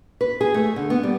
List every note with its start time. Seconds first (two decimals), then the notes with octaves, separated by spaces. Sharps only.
0.21 B4
0.41 G#4
0.54 A3
0.76 D3
0.90 B3
1.03 G3